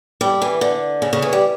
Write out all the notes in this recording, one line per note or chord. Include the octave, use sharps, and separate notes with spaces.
G3
E3
D3
C#3
C#3
E3
G3